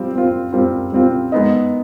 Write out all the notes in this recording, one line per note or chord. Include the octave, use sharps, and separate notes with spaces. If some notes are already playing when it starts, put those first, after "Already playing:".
Already playing: G3 C4 F4
G3 C4 F4
G3 C4 F4
G3 C4 F4
G#3 B3 D#4